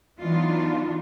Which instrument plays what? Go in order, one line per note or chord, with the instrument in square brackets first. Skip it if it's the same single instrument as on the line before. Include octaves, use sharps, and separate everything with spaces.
[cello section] E3 F#3 B3 D4 D#4 F4